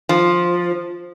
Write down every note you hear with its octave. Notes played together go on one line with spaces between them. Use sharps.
F3